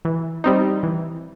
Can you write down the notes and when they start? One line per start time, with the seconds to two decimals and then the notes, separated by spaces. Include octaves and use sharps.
0.05 E3
0.44 G3 C4 D#4
0.83 E3